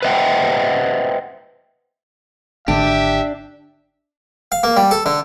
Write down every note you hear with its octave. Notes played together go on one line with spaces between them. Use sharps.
B4 C5 D#5 E5 F#5 G5
G#1 D3 D4 G4 E5
F5
A#3
G3
A4
D3